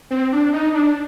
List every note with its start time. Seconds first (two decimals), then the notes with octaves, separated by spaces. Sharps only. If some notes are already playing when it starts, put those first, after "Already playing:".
0.11 C4
0.32 D4
0.53 D#4
0.74 D4